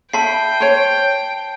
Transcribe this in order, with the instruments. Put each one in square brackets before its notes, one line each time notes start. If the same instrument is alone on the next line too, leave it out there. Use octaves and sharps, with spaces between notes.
[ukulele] E5 B5 [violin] G5 [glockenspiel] A5 C7
[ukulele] C5 C#5